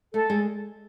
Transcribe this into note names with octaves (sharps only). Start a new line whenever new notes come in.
A3 A4
G#3